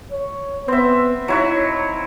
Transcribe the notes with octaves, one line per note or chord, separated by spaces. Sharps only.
C#5
B3 C4 E5
F#3 D#4 E4 F#4